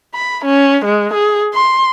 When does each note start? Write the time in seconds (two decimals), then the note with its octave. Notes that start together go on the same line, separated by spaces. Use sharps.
0.15 B5
0.45 C#4
0.85 G#3
1.14 G#4
1.54 C6